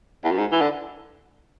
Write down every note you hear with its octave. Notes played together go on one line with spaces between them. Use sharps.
E2
F#2
G#2
E3
D3